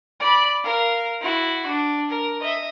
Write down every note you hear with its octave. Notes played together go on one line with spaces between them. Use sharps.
D5 B5
A#4 F5
E4 F#4
D4
A#4
D#5 E5